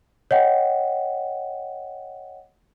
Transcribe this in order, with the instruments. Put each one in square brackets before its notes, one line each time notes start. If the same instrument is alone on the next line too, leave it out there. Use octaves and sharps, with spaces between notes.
[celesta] C#5 D#5 F#5 G5